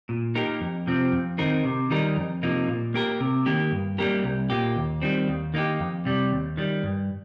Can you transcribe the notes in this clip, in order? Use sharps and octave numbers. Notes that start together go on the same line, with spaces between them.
A#2
A#3 D#4 G4 A#4
F2
C3 F3 C4
F2
D#3 C4 D#4 A#4
C3
D#3 G3 D#4 A#4
F2
C3 F3 A#3 D#4
A#2
A#3 G4 A#4
C3
D#3 A#3 G4
G2
G3 A#3 G4 A#4
C2
A#2 A#3 G4
D#2
D#3 G3 C4
D#2
D#3 A#3 D#4 G4
F2
C3 G3
D#2
D#3 G3
G2